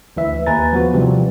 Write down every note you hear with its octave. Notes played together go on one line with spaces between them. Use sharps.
D2 E3 E5
D#2 B4 G#5 A#5 A6
F3 B3 F#4
C3 E3 F3 G3 C4